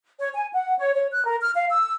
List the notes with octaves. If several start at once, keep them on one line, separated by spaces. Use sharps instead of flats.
C#5
G#5
F#5
C#5
C#5
F#6
A#4
F6
F5
E6